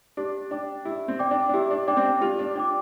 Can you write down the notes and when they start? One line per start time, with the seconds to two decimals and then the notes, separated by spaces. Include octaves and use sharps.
0.17 D4 G4
0.51 D4 D5 G5 D6
0.85 E4 G4
1.08 C4
1.19 D5 G5 D6
1.31 D4
1.49 D4
1.54 E4 G4
1.71 D4
1.87 D4 D5 G5 D6
1.97 C4
2.05 D4
2.22 F4 G4
2.39 D4
2.56 D4 D5 G5 D6